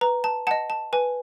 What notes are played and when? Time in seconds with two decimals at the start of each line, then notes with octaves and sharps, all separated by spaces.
0.01 B4 A#5
0.24 A5
0.47 D#5 F#5 A5
0.70 A5
0.93 B4 G#5